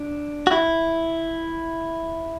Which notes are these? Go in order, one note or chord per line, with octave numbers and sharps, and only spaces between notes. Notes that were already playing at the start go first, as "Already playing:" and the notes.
Already playing: D4
F#4
E4